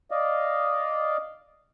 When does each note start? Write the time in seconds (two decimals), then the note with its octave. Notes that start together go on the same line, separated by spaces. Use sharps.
0.11 D5 D#5 F5